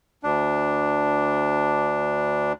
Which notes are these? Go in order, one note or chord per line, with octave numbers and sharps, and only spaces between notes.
D2 D4